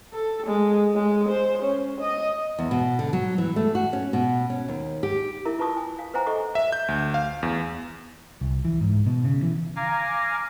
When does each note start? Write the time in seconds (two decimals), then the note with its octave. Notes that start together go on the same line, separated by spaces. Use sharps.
0.14 A4
0.46 G#3
0.95 G#3
1.29 C5
1.62 C#4
2.00 D#5
2.59 E2
2.71 B2
2.99 D3
3.13 F#3
3.38 E3
3.56 A3
3.75 F#4
3.93 C#4
4.13 B2
4.50 C#4
4.68 D#2
5.03 G4
5.45 E4 A#4 E5
5.59 F4 B4 A5 C#6 D#6
5.77 G#5
5.99 F5
6.14 B4 C5 E5 F#5 G#5 A#5
6.27 A4 D#5 F#5 C#6
6.55 E5
6.72 G6
6.88 D2
7.14 F5
7.43 E2
8.41 C2
8.65 E3
8.81 G#2
9.06 B2
9.24 C#3
9.42 E3
9.76 F5 G#5 A#5 D6 F6